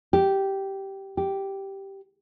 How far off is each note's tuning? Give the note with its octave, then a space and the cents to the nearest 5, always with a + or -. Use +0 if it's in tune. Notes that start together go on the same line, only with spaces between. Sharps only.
G4 -10
G4 -5